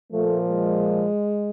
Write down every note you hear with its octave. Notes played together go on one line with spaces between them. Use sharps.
A#2 F3 A3
G#3